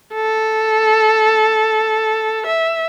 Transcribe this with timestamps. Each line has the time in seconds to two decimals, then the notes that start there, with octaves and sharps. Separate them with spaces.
0.14 A4
2.47 E5